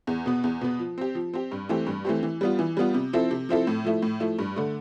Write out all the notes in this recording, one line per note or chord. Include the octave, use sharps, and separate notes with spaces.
E2
B2 B3
E2
B2 B3
F3
C4 G4
F3
C4 G4
G2
E3 A3 C4 G4
G2
E3 A3 C4 G4
E3
G3 B3 F4
E3
G3 B3 F4
C3
F3 C4 E4 A4
C3
F3 C4 E4 A4
A2
F3 A3 E4
A2
F3 A3 E4
G2
D3 A3